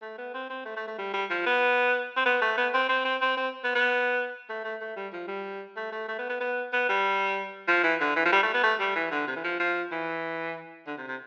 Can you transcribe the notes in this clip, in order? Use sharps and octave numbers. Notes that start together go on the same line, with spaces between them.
A3
B3
C4
C4
A3
A3
A3
G3
G3
F3
B3
C4
B3
A3
B3
C4
C4
C4
C4
C4
B3
B3
A3
A3
A3
G3
F3
G3
A3
A3
A3
B3
B3
B3
B3
G3
F3
E3
D3
E3
F3
G3
A3
B3
A3
G3
E3
D3
C3
E3
F3
F3
E3
D3
C3
C3